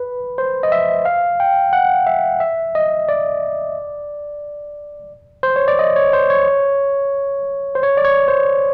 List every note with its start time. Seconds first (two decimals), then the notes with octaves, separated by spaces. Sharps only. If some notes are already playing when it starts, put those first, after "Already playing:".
Already playing: B4
0.38 C5
0.63 D#5
0.72 E5
1.05 F5
1.40 G5
1.73 F#5
2.07 E5
2.40 E5
2.75 D#5
3.09 D5
5.43 C5
5.56 C#5
5.68 D5
5.79 D#5
5.96 C#5
6.13 C5
6.30 C#5
7.75 C5
7.83 C#5
7.97 D5
8.05 C#5
8.28 C5